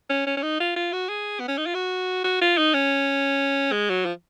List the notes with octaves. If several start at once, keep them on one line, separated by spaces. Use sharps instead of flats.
C#4
C#4
C#4
D#4
F4
F4
F#4
G#4
B3
C#4
D#4
F4
F#4
F#4
F4
D#4
C#4
G#3
F#3
F3